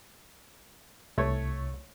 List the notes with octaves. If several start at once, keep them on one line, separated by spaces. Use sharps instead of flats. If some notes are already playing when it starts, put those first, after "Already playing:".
C2 A3 C#5